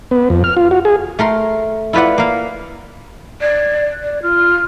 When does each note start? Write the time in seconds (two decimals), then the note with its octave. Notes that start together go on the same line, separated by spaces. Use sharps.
0.11 B3
0.30 F2
0.44 F6
0.57 F4
0.71 F#4
0.85 G#4
1.19 A3 A#4 C6
1.93 E4 F4 B4 D5 F#5
2.18 A#3 F5
3.42 D5 G#6
3.91 F#6
4.03 D5
4.22 F4 F6